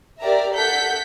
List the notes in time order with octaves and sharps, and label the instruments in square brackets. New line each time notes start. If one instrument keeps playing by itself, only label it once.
[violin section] G4 A#4 D5 E5 A#5
A4 F#5 G6 B6